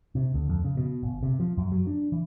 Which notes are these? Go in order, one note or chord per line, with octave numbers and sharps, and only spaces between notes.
C3
D2
F2
C#3
B2
G1
C3
F3
F#2
F#3
D4
E3